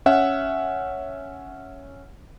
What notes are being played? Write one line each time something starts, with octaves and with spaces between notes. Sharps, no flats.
C#4 E5 F#5